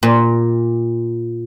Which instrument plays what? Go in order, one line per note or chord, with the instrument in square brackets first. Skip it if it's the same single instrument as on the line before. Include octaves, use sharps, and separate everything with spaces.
[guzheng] A#2